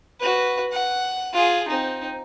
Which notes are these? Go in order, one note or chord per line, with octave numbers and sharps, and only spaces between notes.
F#4 B4
F#5
F4 G#4
C4 D#4